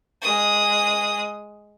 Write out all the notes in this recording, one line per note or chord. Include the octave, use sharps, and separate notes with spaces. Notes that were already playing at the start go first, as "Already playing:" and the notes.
G#3 D#6